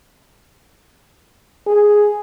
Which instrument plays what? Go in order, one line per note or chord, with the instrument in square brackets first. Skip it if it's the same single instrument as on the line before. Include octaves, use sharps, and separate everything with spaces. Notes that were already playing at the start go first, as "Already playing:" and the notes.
[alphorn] G#4